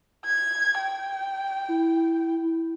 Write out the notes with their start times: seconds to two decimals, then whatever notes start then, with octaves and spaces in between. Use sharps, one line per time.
0.25 G#6
0.79 G5
1.68 E4